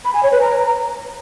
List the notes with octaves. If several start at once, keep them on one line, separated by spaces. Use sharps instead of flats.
B5
G#5
C#5
B4
A#5